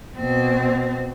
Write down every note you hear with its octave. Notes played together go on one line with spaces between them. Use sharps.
B2 C4